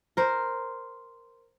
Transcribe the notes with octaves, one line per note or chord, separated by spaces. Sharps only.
A#4 C5